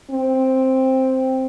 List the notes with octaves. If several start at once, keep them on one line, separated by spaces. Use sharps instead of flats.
C4